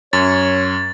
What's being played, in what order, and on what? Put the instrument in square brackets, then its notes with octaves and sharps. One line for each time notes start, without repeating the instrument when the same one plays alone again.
[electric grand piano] F#2 [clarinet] C#5 [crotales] A6